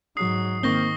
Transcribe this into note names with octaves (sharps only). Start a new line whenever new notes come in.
G#2 F#3 D#6 C7
D#3 A#3 C4 C#6 A#6 G7